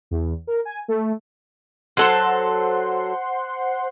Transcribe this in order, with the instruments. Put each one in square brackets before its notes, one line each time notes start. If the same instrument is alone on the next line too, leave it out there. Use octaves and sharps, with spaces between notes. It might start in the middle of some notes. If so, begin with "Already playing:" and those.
[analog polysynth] E2
A#4
G#5
A3
[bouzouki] F#3 A4 [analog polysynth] C5 F#5 C6